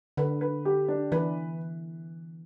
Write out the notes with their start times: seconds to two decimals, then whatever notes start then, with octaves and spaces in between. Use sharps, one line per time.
0.17 D3 B4
0.41 B4
0.65 G4
0.88 D4
1.12 E3 B4